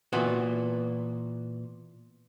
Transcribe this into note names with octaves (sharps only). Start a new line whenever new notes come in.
A#2 E3 B3 F#4